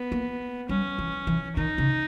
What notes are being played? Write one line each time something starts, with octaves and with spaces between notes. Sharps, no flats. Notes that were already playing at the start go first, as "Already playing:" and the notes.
Already playing: B3
A#3
G3 C#4
E3
E3
D#3 D#4
C#3